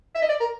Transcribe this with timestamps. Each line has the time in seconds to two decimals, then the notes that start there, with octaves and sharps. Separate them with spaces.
0.15 E5
0.22 D#5
0.29 D5
0.40 A#4